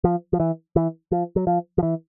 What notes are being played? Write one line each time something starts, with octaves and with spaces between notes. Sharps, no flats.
F3
F3
E3
E3
F3
F#3
F3
F3
E3